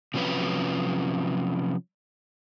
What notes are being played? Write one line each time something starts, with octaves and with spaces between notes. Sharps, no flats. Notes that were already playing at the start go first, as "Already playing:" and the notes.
C3 F3 F#3 C#4 B4